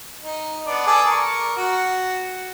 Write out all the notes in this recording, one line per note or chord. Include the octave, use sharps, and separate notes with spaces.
D#4
B3 D4
G#4 A4 D5
A#4 C#6
F#4